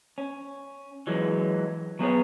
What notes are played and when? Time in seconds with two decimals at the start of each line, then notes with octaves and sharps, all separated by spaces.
0.18 C#4
1.07 E3 F#3 G#3
1.99 F#3 B3 G#4 C#5